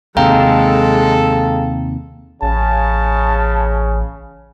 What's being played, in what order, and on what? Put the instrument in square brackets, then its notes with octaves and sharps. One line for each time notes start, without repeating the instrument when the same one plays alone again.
[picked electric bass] D#2 C3 [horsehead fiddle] G#3 [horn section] A4 [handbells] F5 G5 A#5
[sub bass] A1 [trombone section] C#3 [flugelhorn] A5